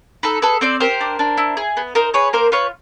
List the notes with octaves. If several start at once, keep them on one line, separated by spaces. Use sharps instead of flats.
D#4 A4 B4
G#4 A4 B4
C4 C5 D5
G4 A#4 C5
D4
D4
E4
G#4
B3
D#4 A#4 C5
G#4 B4 C#5
A#3 A#4 C5
F4 B4 C#5